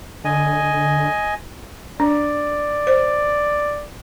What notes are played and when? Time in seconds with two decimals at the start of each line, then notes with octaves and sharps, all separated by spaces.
0.25 D3 D#5 G#5
2.00 D4 D5
2.87 C5